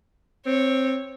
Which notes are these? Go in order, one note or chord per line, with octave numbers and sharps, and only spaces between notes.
C4 C#5